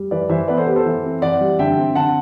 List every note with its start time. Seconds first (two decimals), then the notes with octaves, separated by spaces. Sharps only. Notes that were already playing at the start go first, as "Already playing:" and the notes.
Already playing: G3
0.11 E3 B4 D5
0.29 E3 C5 E5
0.48 B3 B4 D5
0.57 A4 C5
0.67 B3 G4 B4
0.76 A4 C5
0.85 E3
1.04 C4
1.22 E3 D5 F#5
1.41 G3
1.59 D3 E5 G5
1.78 C4
1.95 D3 F#5 A5